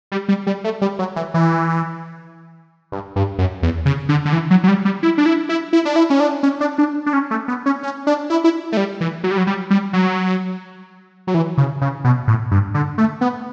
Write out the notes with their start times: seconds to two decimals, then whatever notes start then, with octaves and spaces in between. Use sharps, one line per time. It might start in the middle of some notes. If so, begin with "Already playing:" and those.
0.12 G3
0.28 G3
0.47 G3
0.64 A3
0.81 G3
0.99 F#3
1.16 E3
1.34 E3
2.92 G2
3.16 G2
3.38 F#2
3.63 E2
3.85 C#3
4.09 D3
4.25 D3
4.33 E3
4.50 F#3
4.63 F#3
4.68 G3
4.85 G3
5.03 E4
5.18 D4
5.26 E4
5.49 E4
5.73 E4
5.85 D4
5.96 E4
6.10 C#4
6.20 D4
6.43 C#4
6.61 D4
6.78 D4
7.06 D4
7.13 C#4
7.31 A3
7.48 B3
7.66 C#4
7.83 C#4
8.07 D4
8.30 E4
8.44 E4
8.72 A3
8.77 G3
9.01 E3
9.24 F#3
9.31 G3
9.38 F#3
9.47 G3
9.70 G3
9.93 F#3
11.27 F#3
11.34 E3
11.58 C#3
11.81 C#3
12.04 B2
12.28 A2
12.51 G2
12.74 D3
12.98 A3
13.21 B3